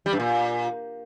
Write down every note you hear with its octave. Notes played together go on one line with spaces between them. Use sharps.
G3
G2
A#2